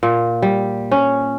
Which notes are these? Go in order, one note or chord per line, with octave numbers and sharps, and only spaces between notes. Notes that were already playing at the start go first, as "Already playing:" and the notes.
A#2
G3
C#4